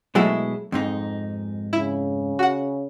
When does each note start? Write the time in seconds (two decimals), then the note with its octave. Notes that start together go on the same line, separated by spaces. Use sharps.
0.15 B2 F#3 G#3 A3 E4
0.72 F2 G#2 D#4
1.73 C#3 E4
2.39 F#4 F#5